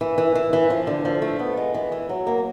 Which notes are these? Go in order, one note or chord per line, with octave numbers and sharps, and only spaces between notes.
E3
E3
E3
E3
F3
D3
F3
A3
B3
G#3
E3
E3
F#3
A#3